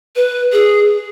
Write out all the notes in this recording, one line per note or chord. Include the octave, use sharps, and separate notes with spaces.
B4
G#4